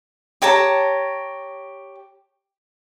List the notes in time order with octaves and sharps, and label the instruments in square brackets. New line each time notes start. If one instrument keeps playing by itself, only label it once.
[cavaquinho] G4 C#5 A5 A#5